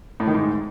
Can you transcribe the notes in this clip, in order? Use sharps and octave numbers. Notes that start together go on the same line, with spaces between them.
A2
D#3
G#2